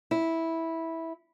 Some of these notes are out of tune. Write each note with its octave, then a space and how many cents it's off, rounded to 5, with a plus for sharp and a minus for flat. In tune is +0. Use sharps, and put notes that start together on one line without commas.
E4 -10